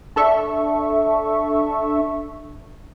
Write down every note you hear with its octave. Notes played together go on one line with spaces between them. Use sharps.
D4 A4 E5 C#6